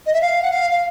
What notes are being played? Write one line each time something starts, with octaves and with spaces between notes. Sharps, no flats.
D#5
E5
F5
F#5
F5
F5